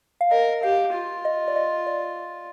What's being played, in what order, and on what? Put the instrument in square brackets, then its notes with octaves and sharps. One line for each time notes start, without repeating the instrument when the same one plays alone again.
[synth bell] F5
[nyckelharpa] A#4 [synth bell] D#5
[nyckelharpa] G4 [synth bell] F5
[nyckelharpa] F4
[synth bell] D#5
D5
D#5
D5